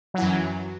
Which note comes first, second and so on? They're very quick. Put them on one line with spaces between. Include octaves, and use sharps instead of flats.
F#3 E3 F#2